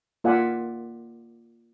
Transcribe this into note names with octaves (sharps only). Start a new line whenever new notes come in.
A#3 F4 D5 E5 F#5 G#5